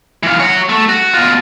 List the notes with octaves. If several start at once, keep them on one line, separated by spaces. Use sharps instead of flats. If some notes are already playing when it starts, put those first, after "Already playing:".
E3 F5
F#4 C#5
A3
F#4
B2 F4